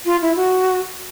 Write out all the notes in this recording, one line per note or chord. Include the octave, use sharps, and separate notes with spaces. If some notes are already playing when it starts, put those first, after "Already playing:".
F4
E4
F#4